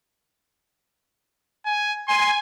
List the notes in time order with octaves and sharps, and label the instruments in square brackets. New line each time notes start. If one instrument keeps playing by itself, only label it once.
[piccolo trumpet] G#5
[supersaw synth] G#5 [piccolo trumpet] C6